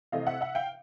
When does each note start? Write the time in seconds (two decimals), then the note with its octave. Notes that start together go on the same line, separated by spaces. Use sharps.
0.12 C3 E3 A3 D#5 F5
0.27 E5 F#5
0.41 E5 F#5
0.55 F5 G5